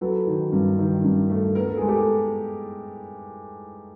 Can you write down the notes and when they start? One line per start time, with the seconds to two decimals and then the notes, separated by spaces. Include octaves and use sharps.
0.01 F#3 A4 B4
0.27 D#3
0.52 G2
0.79 D#3
1.04 G2
1.30 A3
1.55 B3 A#4
1.66 A4
1.77 G#3 G#4
1.88 G4 A4